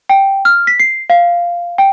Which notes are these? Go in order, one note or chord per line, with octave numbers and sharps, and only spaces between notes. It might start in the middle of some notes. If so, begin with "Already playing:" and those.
G5
F6
B6
C7
F5
G5